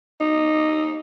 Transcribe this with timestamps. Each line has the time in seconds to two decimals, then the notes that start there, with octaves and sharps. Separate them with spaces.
0.20 D#4